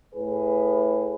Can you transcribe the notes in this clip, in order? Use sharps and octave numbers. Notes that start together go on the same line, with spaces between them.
A2 G#4 B4